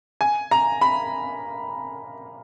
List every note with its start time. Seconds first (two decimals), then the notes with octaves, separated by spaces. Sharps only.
0.21 G#5
0.51 A#5
0.81 B5